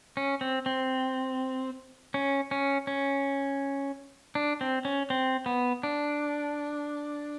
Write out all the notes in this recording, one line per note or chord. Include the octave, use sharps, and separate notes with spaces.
C#4
C4
C4
C#4
C#4
C#4
D4
C4
C#4
C4
B3
D4